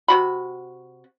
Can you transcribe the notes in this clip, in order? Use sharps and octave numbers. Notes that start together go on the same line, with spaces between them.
C3 F#4 B5